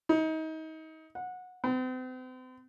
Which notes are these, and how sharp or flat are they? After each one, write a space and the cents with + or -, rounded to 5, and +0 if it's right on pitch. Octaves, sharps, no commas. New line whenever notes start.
D#4 +30
F#5 -20
C4 -40